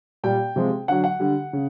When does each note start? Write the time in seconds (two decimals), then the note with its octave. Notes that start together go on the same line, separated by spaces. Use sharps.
0.23 A#2 G3 G5
0.56 C3 F3 G#3
0.88 D3 F#3 F#5
1.04 F#5
1.20 D3 G3
1.53 C#3